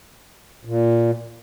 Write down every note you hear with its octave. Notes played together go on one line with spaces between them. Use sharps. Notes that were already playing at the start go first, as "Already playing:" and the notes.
A#2